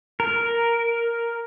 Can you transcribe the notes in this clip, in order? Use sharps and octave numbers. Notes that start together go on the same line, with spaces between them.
A#4